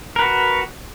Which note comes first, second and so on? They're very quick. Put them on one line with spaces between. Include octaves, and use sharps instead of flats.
A#4 B4 F#4